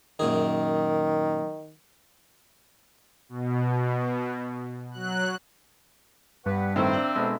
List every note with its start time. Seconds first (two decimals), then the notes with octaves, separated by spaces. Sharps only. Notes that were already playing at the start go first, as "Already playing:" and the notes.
0.20 F#2 A#2 D#3 G#4
3.29 B2
4.91 F#3 F#6
6.46 G2 B3 B4 F#5
6.76 A2 D#3 C4 A#4 E5 F5
6.93 D4
7.16 B2 G#3 D4 E4 A4